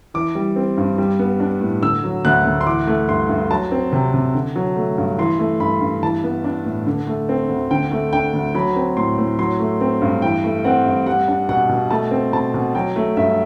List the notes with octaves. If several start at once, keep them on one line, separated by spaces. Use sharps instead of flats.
E3 D6
G3
C4
G2
G3
B3
D4
A2
D3 E6
F#3
D2 F#6
D2
C6
E3 D6
A3
G2 C6
G2
F#3 A5
C4
C3
C3
D3
F#3
A3
G2
E3 C6
A3
G2 B5
G2
E3 A5
B3
D4
A2
D3
A3
C4
D2
D3 G5
A3
D4 G5
D2
F#3 B5
C4
A2 C6
A2
F#3 C6
A3
C4
G2
E3 G5
A3
C4 F#5
G2
G3 F#5
D4
B2 F#5
B2
A3 A5
C4
B2 A5
B2
F#3 G5
A3
G2 E5